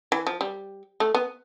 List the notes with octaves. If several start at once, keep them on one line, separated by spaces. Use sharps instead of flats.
E3
F3
G3
A3
B3